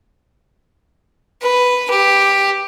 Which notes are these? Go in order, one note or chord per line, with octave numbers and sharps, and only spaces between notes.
B4
G4